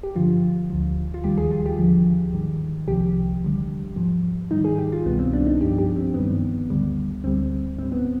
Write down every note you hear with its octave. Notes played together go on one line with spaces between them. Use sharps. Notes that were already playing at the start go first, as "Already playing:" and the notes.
G4
G2 D3 F3 F4
D2 D3 F3
F4
D#2 D#3 G3 G4
G#4
F4
G4
D#2 D3 F3
G#2 D#3 G3
C2 C3 F3 G4
D#2 D3 G3
G#2 F3
G#2 D#3 G3 D#4
G#4
G4
F4
C2 B2 G3 B3
C4
D4
D#4
G2 F3 G4
G4
C4
G2 D#3 G3 B3
D2 D3 G3
D2 D3 G3 C4
G#2 G3 C4
B3